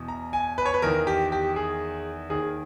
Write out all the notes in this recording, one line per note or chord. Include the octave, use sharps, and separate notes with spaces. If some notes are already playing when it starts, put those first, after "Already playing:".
Already playing: E2 B2
A#5
G#5
B4
C#5
B4
E2 D#3 A#4
G4
G4
G#4
D#2 D#3 G#4